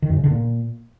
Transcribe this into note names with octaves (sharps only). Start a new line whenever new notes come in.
D#3
F#2
C#3
D3
A#2